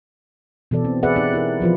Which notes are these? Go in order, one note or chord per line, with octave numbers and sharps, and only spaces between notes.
B2 E3 A4 D5
C4
G#4 B4 D5 E5 F#5
D#4 G4 D5
E4 G4 A#4
E3 F3 F4 B4